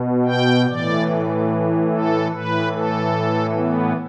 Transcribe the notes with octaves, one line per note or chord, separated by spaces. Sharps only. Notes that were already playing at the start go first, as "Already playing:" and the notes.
Already playing: B2
G5
A2 E3 D5
A4
A2 E3 B4
A4
B3